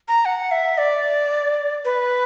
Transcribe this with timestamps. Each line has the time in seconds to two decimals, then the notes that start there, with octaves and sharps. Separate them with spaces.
0.08 A#5
0.25 F#5
0.51 E5
0.78 D5
1.85 B4